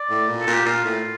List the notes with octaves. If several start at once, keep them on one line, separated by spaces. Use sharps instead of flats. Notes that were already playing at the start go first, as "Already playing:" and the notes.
Already playing: D5
A2
A#2
A4
A#2
G4
A#2 F4
A2